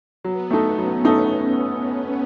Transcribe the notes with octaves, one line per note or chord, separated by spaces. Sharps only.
F#3 B3
A3 D#4 A4
F#3 C#4
A3 D#4 A4